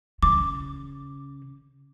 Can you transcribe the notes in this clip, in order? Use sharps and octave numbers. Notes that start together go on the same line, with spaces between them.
C#3 D6